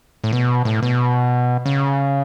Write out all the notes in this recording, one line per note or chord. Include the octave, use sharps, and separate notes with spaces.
A2
B2
A2
B2
C#3